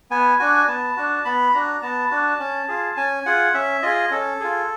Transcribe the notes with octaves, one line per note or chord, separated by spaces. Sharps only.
B3 G#5
D4 F#4 G#5
B3 A5
D4 F#4
B3 B5
D4 F#4 A#5
B3 A5
D4 F#4
C#4
F4 G#4
C#4 G#5
F4 G#4 F#5
C#4 E5
F4 G#4 D#5
C#4 A4
F4 G#4